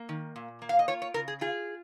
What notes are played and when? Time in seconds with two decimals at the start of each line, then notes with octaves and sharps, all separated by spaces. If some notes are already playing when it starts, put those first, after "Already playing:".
Already playing: A#3
0.09 D#3
0.36 A#2
0.62 A#3
0.69 F5
0.79 D#5
0.88 F4 C#5
1.02 C#5
1.14 C#3 A#4
1.28 G#4
1.41 F4 G#4